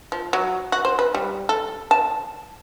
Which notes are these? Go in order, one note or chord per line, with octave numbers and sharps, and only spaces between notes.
F3
F#3
F#4
C5
B4
G3
A4
A5